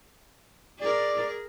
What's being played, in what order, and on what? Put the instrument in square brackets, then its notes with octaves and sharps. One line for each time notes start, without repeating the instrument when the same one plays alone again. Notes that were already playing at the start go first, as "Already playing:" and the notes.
[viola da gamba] G#4 A#4 [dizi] D5